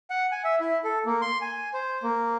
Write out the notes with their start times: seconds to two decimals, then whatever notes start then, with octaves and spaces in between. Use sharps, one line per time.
0.10 F#5
0.32 G#5
0.44 E5
0.61 E4
0.84 A4
1.06 A#3
1.22 C6
1.41 G#5
1.74 C5
2.03 A#3